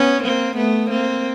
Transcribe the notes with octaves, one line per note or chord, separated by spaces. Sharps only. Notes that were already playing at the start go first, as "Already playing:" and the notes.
Already playing: B3 C#4
A#3 C4
A3 B3
A#3 C4